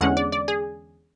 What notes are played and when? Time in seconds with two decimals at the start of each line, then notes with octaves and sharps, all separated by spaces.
0.01 E2 D3 G#3 C#4 F#5
0.17 D5
0.32 D5
0.48 G#4